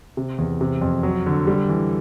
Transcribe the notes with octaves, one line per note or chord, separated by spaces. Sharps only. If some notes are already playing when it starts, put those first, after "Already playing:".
C3
E2
C3
F2
F#3
D3
G3
E3